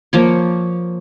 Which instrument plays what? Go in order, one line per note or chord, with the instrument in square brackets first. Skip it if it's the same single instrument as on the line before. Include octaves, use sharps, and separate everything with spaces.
[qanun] F3 A#3 C#5